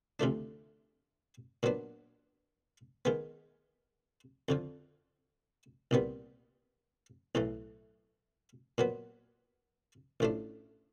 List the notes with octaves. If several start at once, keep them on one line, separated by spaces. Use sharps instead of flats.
D2 C3 F3 A3 D4
A#2 F#3 B3 D4
D#3 G#3 B3
F2 D3 F3
C2 A#2 G3 B3
B1 A2 E3 A3
A#2 F#3 B3
A1 A2 F3 A3 D4